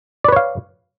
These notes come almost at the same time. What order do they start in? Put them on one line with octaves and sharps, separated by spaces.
D5 B4 C#5 F5